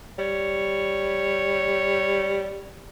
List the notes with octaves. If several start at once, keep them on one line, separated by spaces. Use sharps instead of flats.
G3 C#5